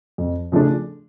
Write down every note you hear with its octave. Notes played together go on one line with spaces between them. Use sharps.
F2
C#3 F3 A3 D4